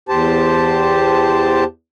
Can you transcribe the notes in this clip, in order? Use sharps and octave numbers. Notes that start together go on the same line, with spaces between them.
E2 G4 C5 A5